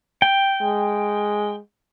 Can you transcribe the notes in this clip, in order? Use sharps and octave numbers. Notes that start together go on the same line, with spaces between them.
G5
G#3